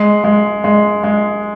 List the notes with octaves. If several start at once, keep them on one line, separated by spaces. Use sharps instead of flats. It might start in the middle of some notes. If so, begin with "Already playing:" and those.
Already playing: G#3
G#3
G#3
G#3